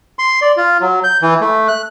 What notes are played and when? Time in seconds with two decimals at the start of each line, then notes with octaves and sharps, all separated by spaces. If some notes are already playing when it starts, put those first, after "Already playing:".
0.19 C6
0.42 D5
0.57 F4
0.81 F#3
1.04 G6
1.22 E3
1.41 A3
1.68 F#6